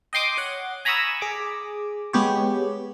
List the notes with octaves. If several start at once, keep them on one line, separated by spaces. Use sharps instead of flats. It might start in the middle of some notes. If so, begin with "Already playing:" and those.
D#5 G5 C6 D6 D#6
C#5 F#5
G#5 A#5 B5 C#6 D#6 E6
G#4 D6
G#3 B3 G4 C#5